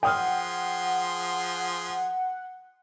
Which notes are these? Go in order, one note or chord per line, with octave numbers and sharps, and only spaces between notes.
F3 G#4 F#5 G5 C6 D#6 F6